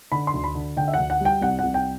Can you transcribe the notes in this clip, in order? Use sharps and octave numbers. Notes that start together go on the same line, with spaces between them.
D3 B5
C6
D2
B5
D3
D3 G5
E5
D2 F#5
F#5
G3 G5
C2 F#5
C2 F#5
G5